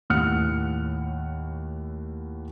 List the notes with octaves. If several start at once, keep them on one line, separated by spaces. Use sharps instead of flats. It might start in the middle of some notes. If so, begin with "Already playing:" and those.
D#2 A2 F#5 F6 F#6 C#7